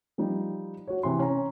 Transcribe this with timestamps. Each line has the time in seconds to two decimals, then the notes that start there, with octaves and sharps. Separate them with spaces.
0.18 F3 G3 D#4
0.88 F#4 C#5
1.03 C3 E3 C6
1.19 C#4 A#5